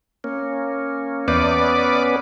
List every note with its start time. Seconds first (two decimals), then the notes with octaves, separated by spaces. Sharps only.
0.24 A#3 C#4
1.28 E2 B3 C#4 B4 D5